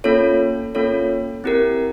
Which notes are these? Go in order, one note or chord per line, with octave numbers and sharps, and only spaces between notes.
A#3 C#4 F4 A4 C#5
A#3 C#4 F4 A4 C#5
C4 E4 G4 A#4